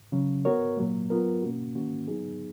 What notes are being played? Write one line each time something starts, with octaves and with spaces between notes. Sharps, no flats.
C#3 F#3 C#4
B3 F#4 A#4 C#5
A#2 F#3 A#3
F#3 B3 F4 A#4
B2 A#3 C#4 F#4
D#3 A#3 C#4 F#4
F#3 B3 D#4 G#4